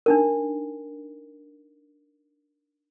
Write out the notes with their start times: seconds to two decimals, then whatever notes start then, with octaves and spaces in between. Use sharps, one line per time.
0.06 D4 D#4 A#4